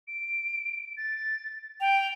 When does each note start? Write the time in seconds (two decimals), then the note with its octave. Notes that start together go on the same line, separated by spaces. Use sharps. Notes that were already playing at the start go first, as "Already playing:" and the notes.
0.08 D7
0.97 A6
1.81 G5 F7